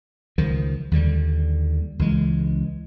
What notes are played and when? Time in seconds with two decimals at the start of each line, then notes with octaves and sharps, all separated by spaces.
0.38 C#2 D#3 F3
0.91 D#2 D3 G3
1.99 C#2 E3 G#3